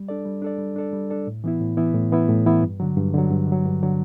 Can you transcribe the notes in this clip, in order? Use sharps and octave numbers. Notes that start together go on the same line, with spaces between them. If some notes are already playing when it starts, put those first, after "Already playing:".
Already playing: G3
D4 A4 D5
G3
D4 A4 D5
G3
D4 A4 D5
G3
D4 A4 D5
A2
E3 B3 E4
A2
E3 B3 E4
A2
E3 B3 E4
A2
E3 B3 E4
G2
D3 F#3
G2
D3 F#3
G2
D3 F#3
G2
D3 F#3